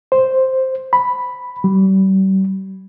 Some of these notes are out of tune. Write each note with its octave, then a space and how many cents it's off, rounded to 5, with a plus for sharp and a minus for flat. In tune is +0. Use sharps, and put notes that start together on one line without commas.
C5 +0
B5 +0
G3 -40